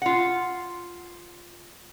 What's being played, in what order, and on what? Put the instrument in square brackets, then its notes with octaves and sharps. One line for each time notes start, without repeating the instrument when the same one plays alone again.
[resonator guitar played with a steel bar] F4 F#5